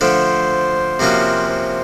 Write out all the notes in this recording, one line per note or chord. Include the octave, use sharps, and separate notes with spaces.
D3 F3 A3 D4 C5
C3 F3 A#3 C#4 F#4
C5